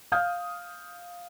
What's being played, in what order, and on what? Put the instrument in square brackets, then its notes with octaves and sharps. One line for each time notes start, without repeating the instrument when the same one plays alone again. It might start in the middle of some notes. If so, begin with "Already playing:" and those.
[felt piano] F5 D#6 F6 G6